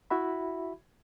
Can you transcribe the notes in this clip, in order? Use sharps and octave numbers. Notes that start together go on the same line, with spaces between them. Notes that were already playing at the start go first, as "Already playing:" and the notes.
E4 F#4 E5 B5